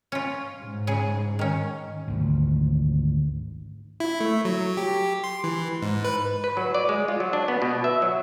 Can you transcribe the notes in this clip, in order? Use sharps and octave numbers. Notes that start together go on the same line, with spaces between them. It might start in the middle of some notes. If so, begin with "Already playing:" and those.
C#4 F4
G#2
C#3 G#4
D#3 C#4
G#1 D2
E4
A3
F#3
G4
C6
E3
G#2
B4
B4
F#3
D5
G#3
F4
F#3
D4
B3
B2
E5
F#3